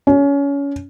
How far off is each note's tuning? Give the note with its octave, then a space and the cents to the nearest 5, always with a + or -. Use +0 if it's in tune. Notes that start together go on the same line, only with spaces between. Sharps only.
C#4 +25